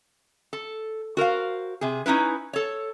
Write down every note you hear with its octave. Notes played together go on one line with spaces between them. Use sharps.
A4
F#4 A#4 C5 F5
C3 G#4
C#4 D#4 E4 B4
A4 C#5